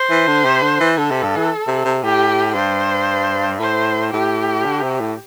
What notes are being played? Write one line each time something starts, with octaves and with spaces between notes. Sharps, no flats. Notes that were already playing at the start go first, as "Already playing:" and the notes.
Already playing: C5
E3
D3
C3
D3
E3
D3 A4
C3
G2
E3
C3
C3
A2 G4
G2 C5
A2 C5
A2 G4
D3
C3
A2